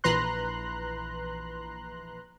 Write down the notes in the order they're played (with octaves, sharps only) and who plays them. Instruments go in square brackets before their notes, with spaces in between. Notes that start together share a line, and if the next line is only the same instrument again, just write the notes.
[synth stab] A#1 E3 B4 A#5 C6 F#6